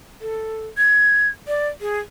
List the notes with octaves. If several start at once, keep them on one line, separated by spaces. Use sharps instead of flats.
A4
G#6
D5
G#4